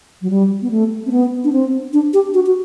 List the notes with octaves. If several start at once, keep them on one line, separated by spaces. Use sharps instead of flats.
F#3
G3
B3
A3
C4
B3
D4
C4
D4
G4
F#4
F#4